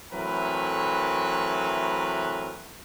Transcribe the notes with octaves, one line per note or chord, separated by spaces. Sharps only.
E3 F#3 A3 C4 A#4 B4